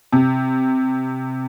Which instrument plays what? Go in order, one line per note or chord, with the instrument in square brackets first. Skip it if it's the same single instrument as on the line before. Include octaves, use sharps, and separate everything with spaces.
[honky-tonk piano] C3